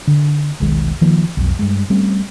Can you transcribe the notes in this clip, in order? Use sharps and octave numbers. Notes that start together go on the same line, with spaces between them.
D3
E1 B1 D#3 G#3
D#3 F3 A#3
B1 F2
G2 G#3
G3 A3 C4 C#4